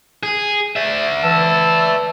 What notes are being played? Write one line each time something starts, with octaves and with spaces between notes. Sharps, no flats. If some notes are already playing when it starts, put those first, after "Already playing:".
G#4
D5 E5
E3 A5 E6